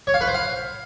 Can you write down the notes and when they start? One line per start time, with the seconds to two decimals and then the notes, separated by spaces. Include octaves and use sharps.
0.07 C#5
0.14 F5
0.21 B4
0.28 C5
0.34 F5